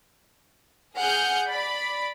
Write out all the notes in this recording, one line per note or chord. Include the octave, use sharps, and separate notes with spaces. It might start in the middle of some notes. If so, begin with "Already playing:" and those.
G#4 F#5 F6 G6
D5 B5